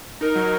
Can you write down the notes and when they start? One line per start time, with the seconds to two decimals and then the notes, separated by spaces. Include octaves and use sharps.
0.21 D#4 A#4
0.36 F#3